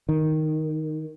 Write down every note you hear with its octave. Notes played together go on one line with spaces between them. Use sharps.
D#3